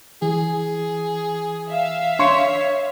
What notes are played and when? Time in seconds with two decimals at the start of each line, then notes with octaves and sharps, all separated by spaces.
0.22 E3 G#4
1.67 E5 F5
2.19 D4 C#5 C6 C#6